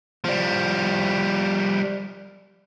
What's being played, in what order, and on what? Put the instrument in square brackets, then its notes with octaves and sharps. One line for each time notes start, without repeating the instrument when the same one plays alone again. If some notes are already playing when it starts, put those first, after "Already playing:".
[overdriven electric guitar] F3 G3